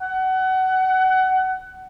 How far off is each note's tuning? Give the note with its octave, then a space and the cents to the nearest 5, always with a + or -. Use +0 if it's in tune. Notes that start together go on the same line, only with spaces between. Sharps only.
F#5 +25